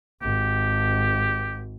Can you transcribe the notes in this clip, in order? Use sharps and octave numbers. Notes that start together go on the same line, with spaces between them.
G#1 G4